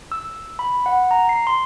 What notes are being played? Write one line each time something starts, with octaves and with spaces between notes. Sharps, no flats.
E6
B5
F#5
A#5
C7
C6